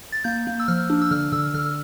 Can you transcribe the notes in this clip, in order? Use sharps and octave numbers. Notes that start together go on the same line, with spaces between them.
A6
A#3 G6
A#3
E6
F3 F6
D4
E6
D3 F6
D3 E6
D3 F6